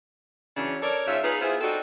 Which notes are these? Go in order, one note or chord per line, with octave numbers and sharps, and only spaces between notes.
C#3 E3 F#3 C#4 D4
A4 A#4 C#5 D5
G#2 C#4 F4 E5
D#4 F4 G#4 B4
B3 E4 F4 G#4 C5
C4 D4 D#4 F#4 A4